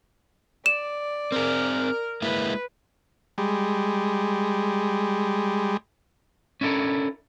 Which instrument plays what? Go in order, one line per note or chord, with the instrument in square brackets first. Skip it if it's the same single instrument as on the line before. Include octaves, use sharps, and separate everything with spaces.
[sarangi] D5 [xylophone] E7
[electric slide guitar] C4 G#4 [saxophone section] A#4
[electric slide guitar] G#3 A#3 E4 [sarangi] B4
[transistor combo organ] G3 G#3
[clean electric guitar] C#4 D4 E4 A4 A#4